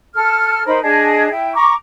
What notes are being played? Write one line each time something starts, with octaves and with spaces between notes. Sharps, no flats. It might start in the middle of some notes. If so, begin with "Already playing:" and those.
A4 F6
D#4 A#4 C5 B5
D4 G#4 D#5 A5
E4 G5
A#5 C#6 D6